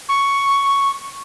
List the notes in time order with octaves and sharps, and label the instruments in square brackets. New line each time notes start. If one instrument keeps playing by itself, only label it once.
[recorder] C#6